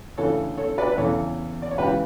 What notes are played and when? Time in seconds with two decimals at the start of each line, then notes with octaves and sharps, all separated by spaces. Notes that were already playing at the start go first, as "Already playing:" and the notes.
0.17 D2 C#3 E3 A4 C#5
0.57 A4 C#5
0.78 B4 D5
0.92 B4
0.98 E2 C#3 E3 A4 C#5
1.62 D5
1.71 C#5
1.78 C#2 C#3 E3 G4 B4